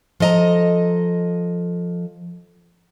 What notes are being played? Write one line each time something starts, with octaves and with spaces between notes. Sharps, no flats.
F3 A4 D#5 G#5 A#5